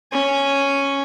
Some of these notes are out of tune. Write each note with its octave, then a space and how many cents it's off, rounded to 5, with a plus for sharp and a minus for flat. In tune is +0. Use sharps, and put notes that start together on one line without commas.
C#4 +0 G#5 +0